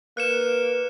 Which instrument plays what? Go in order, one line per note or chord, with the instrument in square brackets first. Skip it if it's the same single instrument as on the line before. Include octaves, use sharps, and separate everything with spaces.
[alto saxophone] A#3 [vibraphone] B4 [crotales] F#6 C#7 E7